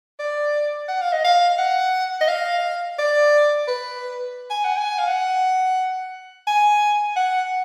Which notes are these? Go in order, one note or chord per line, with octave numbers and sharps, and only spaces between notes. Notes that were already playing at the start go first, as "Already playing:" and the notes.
D5
F#5
F5
D#5
F5
F#5
D#5
F5
D5
B4
G#5
F#5
G#5
F5
F#5
G#5
F#5